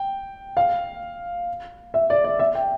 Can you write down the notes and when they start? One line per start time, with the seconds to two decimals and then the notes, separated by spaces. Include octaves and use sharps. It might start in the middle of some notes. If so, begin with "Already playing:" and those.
Already playing: G5
0.57 F5
1.94 E5
2.10 D5
2.24 D5
2.39 E5
2.55 G5